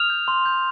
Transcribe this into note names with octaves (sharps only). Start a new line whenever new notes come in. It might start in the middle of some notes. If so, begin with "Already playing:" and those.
Already playing: D#6 F6 F7
G6
C6
G6